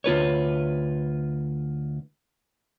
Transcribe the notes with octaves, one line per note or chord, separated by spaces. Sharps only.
D2 F4 B4 C#5